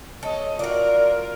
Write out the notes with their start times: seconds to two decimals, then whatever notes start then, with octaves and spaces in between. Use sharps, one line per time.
0.23 A4 C#5 D#5
0.59 F4 F#4 A#4 D5